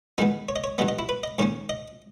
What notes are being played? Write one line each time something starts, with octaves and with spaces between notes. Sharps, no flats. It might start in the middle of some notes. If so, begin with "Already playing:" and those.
E2 D#3 G#3 B3 D#4
C#5
D#5
C#5
G2 E3 G3 B3 D#5
D#5
E4
B4
D#5
G#2 D#3 A#3 C#4 C#5
D#5